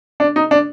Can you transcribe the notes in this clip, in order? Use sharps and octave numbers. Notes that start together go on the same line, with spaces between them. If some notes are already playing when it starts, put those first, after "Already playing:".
D4
D#4
D4